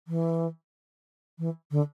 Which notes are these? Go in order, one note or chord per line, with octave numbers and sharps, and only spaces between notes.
E3
E3
D3